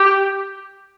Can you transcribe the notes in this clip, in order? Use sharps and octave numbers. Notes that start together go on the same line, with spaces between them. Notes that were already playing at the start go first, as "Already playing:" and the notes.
Already playing: G4